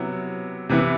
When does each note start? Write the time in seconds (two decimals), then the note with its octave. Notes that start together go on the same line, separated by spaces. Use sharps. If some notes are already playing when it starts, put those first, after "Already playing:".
Already playing: C3 F#3 B3 E4
0.69 C3 E3 B3 E4